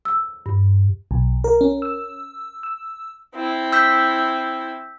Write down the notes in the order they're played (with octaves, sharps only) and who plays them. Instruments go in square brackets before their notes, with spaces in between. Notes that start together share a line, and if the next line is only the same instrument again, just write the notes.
[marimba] E6
G2
[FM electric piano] B1
A#4
C#4
E6
E6
[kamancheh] C4 E4
[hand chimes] E6 G6 B6